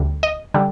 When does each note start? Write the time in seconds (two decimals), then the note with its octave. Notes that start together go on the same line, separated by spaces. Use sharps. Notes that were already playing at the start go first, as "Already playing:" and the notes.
Already playing: D2 D3 G3
0.23 D#5
0.54 D3 G3